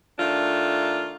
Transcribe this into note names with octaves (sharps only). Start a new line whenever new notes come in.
D#3 A3 D4 F4